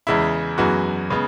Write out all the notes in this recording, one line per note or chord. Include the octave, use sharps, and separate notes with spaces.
E2 C#3 G#3 E4
F#2 E3 G#3 B3 F#4
C#3 G#3 B3